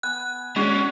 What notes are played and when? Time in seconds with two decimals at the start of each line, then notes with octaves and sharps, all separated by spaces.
0.03 B3 G#5 F#6
0.56 G#3 C#4 D4 F#4